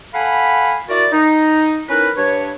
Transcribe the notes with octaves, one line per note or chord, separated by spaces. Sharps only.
A4 F5 F#5 G#5 B5
E4 F#4 A#4 D5
D#4
C#4 D#4 E4 A#4 B4
G2 D4 B4 C#5